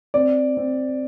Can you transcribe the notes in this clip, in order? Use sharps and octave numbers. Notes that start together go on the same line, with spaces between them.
C4 D5
C4